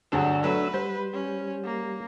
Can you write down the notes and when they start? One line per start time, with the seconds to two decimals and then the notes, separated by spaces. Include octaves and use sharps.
0.12 D2 G2 F#3 D4 G#4 E6
0.44 F#3 A3 B4
0.74 G3 C5
1.14 C#4
1.64 A#3